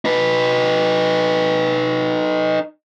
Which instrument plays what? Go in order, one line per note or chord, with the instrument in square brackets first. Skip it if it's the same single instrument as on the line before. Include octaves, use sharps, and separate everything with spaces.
[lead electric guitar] D#4 B4